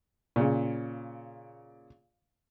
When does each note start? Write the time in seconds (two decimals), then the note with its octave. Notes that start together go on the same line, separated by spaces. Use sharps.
0.36 A#2 C#3